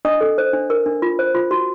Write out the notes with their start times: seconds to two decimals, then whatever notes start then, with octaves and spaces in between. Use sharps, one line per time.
0.05 D4 D#5 D#6
0.21 A4
0.38 C5
0.53 D4
0.70 A#4
0.86 D4
1.02 F4
1.19 C5
1.35 F4
1.51 F#4